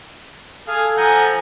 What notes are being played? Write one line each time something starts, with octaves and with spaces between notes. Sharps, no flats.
G#4 A4 F5
F3 F#5 G#5 A#5 G6